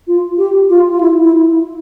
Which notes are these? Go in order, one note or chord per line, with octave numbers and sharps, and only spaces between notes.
F4
G4
F4
F4
E4
E4